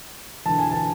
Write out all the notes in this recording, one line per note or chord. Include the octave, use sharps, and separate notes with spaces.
E1 E2 D3 A5
G#5
A5